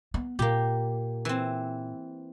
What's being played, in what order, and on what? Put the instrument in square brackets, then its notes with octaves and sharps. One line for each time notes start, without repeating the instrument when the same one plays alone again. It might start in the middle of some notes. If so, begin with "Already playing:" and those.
[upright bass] B3
[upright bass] A#2 [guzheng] A#3 G4
[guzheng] E3 C4